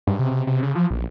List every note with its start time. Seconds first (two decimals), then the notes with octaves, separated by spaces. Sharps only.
0.07 G2
0.19 C3
0.31 C3
0.47 C3
0.63 C#3
0.75 F3
0.90 A#1